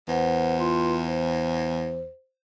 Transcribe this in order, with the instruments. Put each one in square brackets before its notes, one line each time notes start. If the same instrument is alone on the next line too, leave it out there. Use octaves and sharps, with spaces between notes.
[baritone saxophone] E2 [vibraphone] B4 C5 F#5
[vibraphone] F4 B4 C6
C5